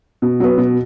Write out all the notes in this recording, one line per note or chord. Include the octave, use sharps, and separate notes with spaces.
B2
F#3 B3
B2